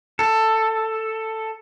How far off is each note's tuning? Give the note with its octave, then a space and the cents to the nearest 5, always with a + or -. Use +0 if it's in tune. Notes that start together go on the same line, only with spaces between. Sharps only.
A4 +10